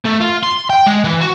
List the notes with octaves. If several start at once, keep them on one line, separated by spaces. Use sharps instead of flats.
A3
F4
C6
G5
G#3
E3
F#4